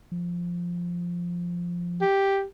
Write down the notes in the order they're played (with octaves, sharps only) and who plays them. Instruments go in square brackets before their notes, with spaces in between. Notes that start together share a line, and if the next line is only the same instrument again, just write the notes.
[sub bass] F3
[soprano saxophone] G4